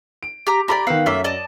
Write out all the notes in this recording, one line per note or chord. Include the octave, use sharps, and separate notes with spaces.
D7
G4 A#5
G4 A#4 D5 A#5 B5 A#6
D#3 B3 F5 F#5 E6
F#2 A3 A#3 E5
D5 D#5 A5